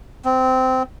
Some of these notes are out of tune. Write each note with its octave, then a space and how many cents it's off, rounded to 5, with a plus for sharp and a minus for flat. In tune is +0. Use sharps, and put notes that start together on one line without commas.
C4 -15